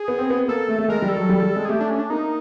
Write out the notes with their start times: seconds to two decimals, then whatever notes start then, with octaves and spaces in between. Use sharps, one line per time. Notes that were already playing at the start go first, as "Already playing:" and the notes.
Already playing: G#4
0.08 B3
0.19 C4
0.30 B3
0.48 A#3 A4
0.68 A3
0.79 A3
0.89 G#3 A#4
1.02 G3
1.09 A4
1.17 F#3
1.29 G3
1.42 G3
1.56 G#3
1.65 G#4
1.69 A3 G4
1.80 D4
1.90 C#4
1.99 D4
2.10 A#3 D#4